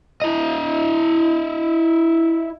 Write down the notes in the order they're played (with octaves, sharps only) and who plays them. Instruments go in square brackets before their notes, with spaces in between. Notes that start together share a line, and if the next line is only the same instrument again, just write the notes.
[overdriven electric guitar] E4 D#5